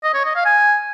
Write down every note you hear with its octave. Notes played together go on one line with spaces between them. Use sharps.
D#5
C#5
D#5
F5
G#5